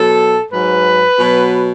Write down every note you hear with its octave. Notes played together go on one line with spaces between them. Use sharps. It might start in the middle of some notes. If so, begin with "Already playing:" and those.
Already playing: B2 F#3 A4
G#2 F#3 B4
B2 F#3